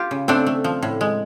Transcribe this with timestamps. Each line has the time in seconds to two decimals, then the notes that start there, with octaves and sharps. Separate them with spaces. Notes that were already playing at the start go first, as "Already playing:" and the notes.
Already playing: F4 G4
0.11 C#3
0.28 A3 C4 D4
0.46 A3
0.64 F3
0.82 A2
1.01 G#3